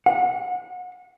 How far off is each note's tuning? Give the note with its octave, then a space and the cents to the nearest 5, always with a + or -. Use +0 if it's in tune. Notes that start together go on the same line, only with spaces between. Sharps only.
F#5 -30